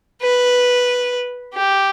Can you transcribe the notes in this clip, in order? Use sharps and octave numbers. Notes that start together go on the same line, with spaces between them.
B4
G4